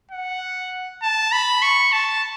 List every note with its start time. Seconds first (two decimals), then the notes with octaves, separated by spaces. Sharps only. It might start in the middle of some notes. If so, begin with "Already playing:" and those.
0.11 F#5
1.02 A5
1.32 B5
1.62 C#6
1.92 A5